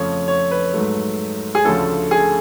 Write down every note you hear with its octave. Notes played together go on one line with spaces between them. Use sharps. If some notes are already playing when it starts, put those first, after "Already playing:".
Already playing: F2 C#3 F3 A3 C#5
C#5
B4
G#2 F#3 A3
G#4
D2 C#3 F3 A3 A4
G#4